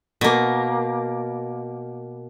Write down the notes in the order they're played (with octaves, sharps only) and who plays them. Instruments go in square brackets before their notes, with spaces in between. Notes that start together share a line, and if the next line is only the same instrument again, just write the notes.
[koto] B2 A#3